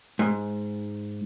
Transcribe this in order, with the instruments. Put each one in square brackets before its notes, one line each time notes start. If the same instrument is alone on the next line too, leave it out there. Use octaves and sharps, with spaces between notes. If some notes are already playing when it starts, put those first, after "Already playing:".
[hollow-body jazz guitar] G#2